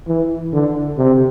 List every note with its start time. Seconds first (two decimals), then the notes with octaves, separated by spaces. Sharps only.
0.08 E3
0.53 D3
0.98 C3